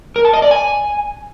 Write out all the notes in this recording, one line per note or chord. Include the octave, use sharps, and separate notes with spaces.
A#4
A5
D#5
D5
G#5